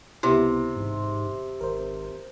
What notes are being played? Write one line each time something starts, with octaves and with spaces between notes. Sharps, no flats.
C#2 C3 B3 E4
A1 E2 G#2
G#1 A#4 C5